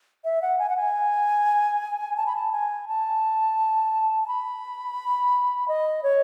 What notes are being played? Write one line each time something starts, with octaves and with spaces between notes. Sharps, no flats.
E5
F#5
G#5
F#5
G#5
A5
B5
A5
G#5
A5
A5
B5
D#5
C#5